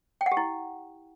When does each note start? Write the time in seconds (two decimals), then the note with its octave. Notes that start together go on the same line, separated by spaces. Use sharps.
0.21 G5
0.26 F#5
0.32 G4
0.37 E4